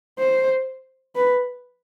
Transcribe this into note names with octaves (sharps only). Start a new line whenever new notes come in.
C5
B4